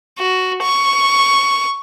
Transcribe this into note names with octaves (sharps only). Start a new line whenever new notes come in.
F#4
C#6